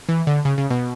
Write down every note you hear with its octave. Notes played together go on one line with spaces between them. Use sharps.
E3
D3
C#3
C#3
B2